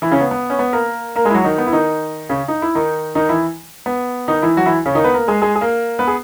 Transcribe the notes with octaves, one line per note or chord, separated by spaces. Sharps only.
E3 E4
C#3 C#4
B3
B3
C#4
B3
A#3 A#4
A#3 A#4
G#3 E4 G#4
F#3 F#4
D#3 D#4
B3
E4
D#3 D#4
C#3 C#4
D#4
E4
D#3 D#4
D#3 D#4
E3 E4
B3
D#3 D#4
E3 E4
F#3 F#4
E3 E4
C#3 C#4
D#3 D#4
B3 B4
A#3 A#4
G#3 G#4
G#3 G#4
G#4
A#3 A#4
B3 B4
G#4